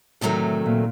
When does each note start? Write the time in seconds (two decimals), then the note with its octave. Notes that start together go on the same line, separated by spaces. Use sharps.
0.21 D2 A2 C3 D#3 F#3 A3
0.66 A#2